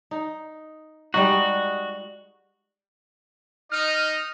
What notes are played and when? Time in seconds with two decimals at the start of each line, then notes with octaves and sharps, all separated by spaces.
0.11 D#4
1.14 G3 G#3 D#4 F#4
3.72 D#4 D#5 F6